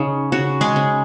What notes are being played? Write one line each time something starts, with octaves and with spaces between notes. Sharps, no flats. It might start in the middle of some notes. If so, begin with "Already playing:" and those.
Already playing: C#3 D#4
C#3 F#4
G#3 G#4
C#3